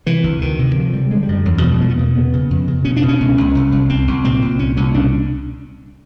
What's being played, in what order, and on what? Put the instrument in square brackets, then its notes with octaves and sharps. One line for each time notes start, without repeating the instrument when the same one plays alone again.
[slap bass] C3 E3
D2
D2 D#3
C3
D3 F3
D3 G3
D3 G#3
G3
F#2
G3
E2 F#3
E3
B2 F3
G3
E2 G#3
B3
B2 A#3
C#3 B3
C#3
F2
C#3
B2 C#4
D4
B2
C#4
C#2
C#2
C2
C2
C2 C4
C2
A#2 C4
C2
A#2 C#4
C2 C#4
B2 D4